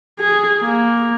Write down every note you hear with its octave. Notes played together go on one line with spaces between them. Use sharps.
G#4
A#3